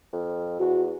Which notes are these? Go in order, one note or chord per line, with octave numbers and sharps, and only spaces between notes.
F2
E2 F#4